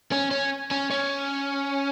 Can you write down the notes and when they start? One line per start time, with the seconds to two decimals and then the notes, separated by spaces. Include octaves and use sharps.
0.12 C#4
0.31 C#4
0.71 C#4
0.91 C#4